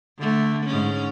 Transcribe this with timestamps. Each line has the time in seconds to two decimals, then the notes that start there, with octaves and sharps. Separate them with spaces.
0.18 D3 A3
0.66 G#2 C#4